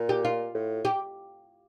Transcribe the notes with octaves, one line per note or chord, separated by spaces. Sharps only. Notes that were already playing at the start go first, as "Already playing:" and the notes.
Already playing: A#2
G4
F4
A2
G4